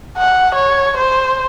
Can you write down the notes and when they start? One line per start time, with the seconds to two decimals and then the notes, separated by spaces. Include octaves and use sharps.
0.18 F#5
0.55 C#5
0.97 C5